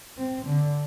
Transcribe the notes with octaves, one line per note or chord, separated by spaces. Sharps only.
C4
D3